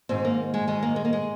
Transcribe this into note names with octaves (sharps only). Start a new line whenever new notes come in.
G#2 D#3 C4
A#3
G#3
G#2 D#3 G#3
A#3
G#3
A#3
G#3